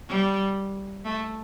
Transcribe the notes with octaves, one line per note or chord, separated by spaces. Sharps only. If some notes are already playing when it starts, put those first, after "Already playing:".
G3
A3